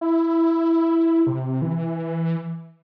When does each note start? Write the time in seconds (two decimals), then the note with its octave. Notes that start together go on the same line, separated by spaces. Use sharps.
0.01 E4
1.27 C3
1.62 E3